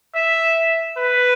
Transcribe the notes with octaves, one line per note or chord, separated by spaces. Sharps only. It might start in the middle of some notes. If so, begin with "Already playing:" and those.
E5
B4